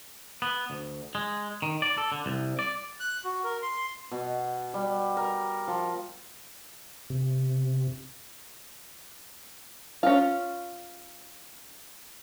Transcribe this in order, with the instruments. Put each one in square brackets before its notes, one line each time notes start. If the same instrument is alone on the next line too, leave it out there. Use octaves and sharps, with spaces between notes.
[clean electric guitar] B3
D2
G#3
D#3
D5
A4
D3
C2
D5
[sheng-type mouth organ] F#6
F#4
A#4
C6
[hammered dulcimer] B2
G3
A#4
F3
[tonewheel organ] C3
[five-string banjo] C#4 F4